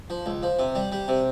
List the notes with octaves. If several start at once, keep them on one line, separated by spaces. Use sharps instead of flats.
F3
C#2
F3
C3
G3
G3
C3